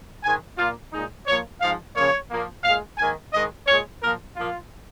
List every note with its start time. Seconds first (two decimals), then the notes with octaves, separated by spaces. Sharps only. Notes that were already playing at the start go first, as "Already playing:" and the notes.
0.23 G#2 D#3 G#3 G#5
0.58 A#2 A#3 F4
0.92 A#2 G#3 D#4
1.26 A#2 F3 A#3 C#5
1.61 G#2 F3 G#3 F5
1.95 C#3 F3 A#3 C#5
2.30 A#2 F3 A#3
2.64 A#2 G#3 F5
2.98 G#2 D#3 A#3 G#5
3.32 G#2 D#3 G#3 D#5
3.67 A#2 G#3 C#5
4.01 A#2 F3 A#3 A#4
4.36 A#2 F3 A#3 F4